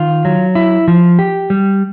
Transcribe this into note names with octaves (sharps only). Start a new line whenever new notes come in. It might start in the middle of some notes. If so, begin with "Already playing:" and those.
Already playing: D#3 F4
F#3
E4
F3
G4
G3